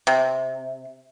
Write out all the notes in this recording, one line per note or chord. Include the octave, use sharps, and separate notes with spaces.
C3